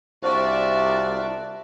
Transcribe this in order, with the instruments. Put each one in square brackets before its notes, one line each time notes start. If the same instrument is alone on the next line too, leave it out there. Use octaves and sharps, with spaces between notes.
[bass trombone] C2 [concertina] D4 F4 F#4 [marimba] C5 C#6 [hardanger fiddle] D5 E5